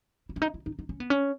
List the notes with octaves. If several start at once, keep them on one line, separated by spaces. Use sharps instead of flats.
E4
C#4
D#4
E4
D#4
D#4
C#4
B3
C#4